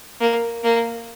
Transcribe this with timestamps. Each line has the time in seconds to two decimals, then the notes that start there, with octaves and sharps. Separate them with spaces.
0.21 A#3
0.64 A#3